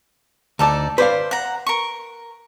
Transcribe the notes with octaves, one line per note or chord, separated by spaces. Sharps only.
D2 D#4 A4 D5 A5
B4 C5 D5 F5
F#5 A#5
A#4 C#6